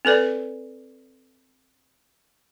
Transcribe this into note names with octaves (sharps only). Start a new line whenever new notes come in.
C4 A4 B4 D5